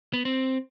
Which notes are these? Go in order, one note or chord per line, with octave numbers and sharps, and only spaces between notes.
B3
C4